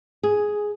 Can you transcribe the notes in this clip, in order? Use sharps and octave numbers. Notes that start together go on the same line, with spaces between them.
G#4